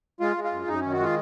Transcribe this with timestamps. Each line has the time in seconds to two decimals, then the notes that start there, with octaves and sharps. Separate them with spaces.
0.20 G#3 F4
0.36 G#3
0.44 F4
0.52 F#2
0.67 F#2 D#4
0.80 D#3 C#4
0.92 F#4
0.99 G#3 F4